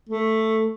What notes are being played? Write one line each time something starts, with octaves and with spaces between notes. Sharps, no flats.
A3